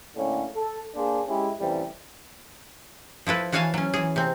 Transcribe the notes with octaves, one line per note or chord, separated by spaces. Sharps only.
A2 D3 A#3 C#4 D4
A4
A#3 D4 G#4 C5
G#3 C#4 E4 G4 G#4
A1 F2 C3 E3 G3
F3 E4 A4 B4
E3 F#4 C#5 F5 G#5 A5
F#3 C#4
E3 G#4
C3 C4